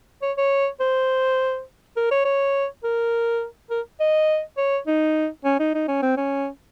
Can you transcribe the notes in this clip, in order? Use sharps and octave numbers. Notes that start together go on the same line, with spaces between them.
C#5
C#5
C5
A#4
C#5
C#5
A#4
A#4
D#5
C#5
D#4
C#4
D#4
D#4
C#4
C4
C#4